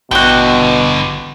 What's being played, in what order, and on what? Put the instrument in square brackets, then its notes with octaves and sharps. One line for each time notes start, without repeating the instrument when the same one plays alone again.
[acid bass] A1 [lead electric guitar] G2 D3 [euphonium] B2 [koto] F#4 G5